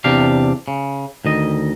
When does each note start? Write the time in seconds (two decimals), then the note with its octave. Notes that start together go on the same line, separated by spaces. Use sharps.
0.04 E2 C3 D4 G4 F5
0.68 C#3
1.25 D2 D#3 D#5